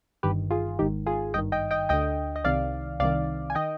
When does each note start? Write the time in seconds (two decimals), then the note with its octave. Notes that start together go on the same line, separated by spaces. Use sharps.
0.23 G1 G2 D#3 G4 B4
0.51 F4 G#4
0.79 G#1 G#2 D#3 D#4 G4
1.06 F4 G#4
1.34 G#1 G2 D#3 D#5 G5
1.52 D#5 G5
1.71 D#5 G5
1.89 D2 D3 D#5 G5
2.36 D#5
2.44 C2 C3 D#3 D5 F5
3.00 C2 C3 D#3 D5 F5
3.50 G#5
3.55 D#3 D#5 G5